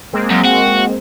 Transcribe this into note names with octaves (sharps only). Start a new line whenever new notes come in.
G#3 A#3 C4
F#2
F#4